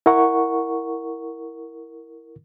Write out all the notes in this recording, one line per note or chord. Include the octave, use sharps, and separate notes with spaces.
E4 A#4 F#5 C#6